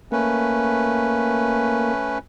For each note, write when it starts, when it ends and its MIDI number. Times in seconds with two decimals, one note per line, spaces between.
0.12 2.18 57
0.12 1.94 58
0.12 2.18 61
0.12 2.18 71